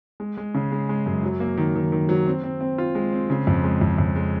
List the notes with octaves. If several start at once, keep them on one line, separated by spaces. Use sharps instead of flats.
G#3
G#3
C#3
G#3
G#3
F#2
F#3
A#3
D#3
D#3
D#3
F#3
C4
C4
C4
F4
G#3
C4
C#3
F2
G#3
F2
F2
G#3